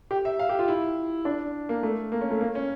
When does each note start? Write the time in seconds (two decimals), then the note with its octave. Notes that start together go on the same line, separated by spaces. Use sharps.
0.11 G4
0.25 E5
0.39 F5
0.49 G4
0.59 F4
0.68 E4
1.25 D4
1.69 A#3
1.83 A3
2.12 A#3
2.21 C#4
2.31 A3
2.41 A#3
2.55 C#4